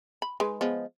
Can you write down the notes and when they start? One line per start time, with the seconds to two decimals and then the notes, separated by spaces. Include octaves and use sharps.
0.22 B5
0.40 G#3 D#4 B4
0.61 F3 G#3 B3